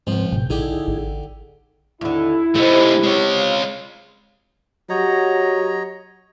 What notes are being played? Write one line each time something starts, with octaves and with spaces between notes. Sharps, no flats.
C#2 G#2 F3 G#3 C4
G#1 G#2 B2 G5
A#1 D3 D#4 E4 G4 G#4
A1
D#2 D3 E4
C3 A3 D#4
G#3 C#5
F5
F#3 G4 C#5 D#5 F#5 A#5